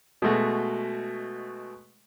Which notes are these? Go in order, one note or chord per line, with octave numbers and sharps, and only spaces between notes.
B2 G#3 A3 F#4